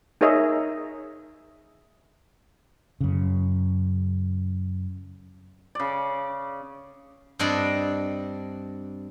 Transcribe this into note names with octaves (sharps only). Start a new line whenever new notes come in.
D#4 G#4 A#4 C#5 D#5 E5
F#2 C#3
C#3 D5
G2 C4 D4 D5 D#5